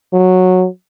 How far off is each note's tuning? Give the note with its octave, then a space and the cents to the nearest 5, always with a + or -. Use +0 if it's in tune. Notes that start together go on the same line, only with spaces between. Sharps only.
F#3 -10